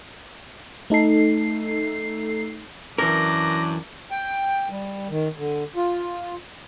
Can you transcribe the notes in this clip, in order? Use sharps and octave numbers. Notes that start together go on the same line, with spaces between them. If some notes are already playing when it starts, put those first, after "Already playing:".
A3 D#4 A4 C7
F#2 E3 D4 A#4 D6 A#6
G5
G3
D#3
D3
F4